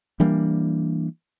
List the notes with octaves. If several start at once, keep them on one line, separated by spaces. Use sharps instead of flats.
E3 G3 A#3 D4